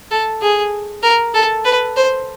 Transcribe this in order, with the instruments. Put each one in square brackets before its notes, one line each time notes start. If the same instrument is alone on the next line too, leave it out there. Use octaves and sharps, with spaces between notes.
[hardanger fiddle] A4
G#4
A#4
A4
B4
C5